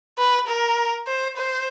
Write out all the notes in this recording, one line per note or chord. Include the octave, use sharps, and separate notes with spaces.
B4
A#4
C5
C5